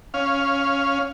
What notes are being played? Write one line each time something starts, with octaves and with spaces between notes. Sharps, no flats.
C#4 F5